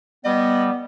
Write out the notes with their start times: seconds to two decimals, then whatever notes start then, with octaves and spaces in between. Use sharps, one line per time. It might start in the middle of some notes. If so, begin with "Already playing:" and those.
0.25 G3 B3 D#5